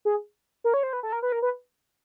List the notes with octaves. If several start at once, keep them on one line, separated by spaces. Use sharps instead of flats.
G#4
A#4
C#5
C5
B4
A4
A#4
B4
A#4
B4